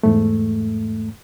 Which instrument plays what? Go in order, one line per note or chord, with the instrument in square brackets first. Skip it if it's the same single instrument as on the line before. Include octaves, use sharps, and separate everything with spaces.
[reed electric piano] E2 G#2 A3